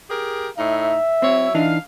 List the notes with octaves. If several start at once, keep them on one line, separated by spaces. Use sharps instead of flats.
G4 G#4 A#4
A2 D#4 E5
F#3 C4 E4 C#5
E3 D4 D#4 F5